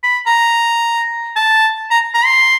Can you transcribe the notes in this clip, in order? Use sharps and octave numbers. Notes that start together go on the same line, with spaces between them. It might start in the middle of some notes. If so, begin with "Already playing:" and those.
B5
A#5
A5
A#5
A#5
C6